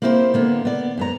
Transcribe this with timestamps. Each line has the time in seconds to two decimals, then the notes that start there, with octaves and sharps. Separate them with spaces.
0.02 A#3 C4 E4 G4 A4 C5
0.34 D3 A#3 B3
0.65 B3 D5
0.98 F#2 B3 A#5